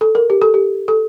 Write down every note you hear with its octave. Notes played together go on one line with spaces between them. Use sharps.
A4
A#4
G4
A4
G4
A4